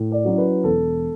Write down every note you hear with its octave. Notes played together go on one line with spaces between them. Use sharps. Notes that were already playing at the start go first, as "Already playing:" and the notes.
Already playing: A2
D5
F#3 C#4 E4
B4
E1 A4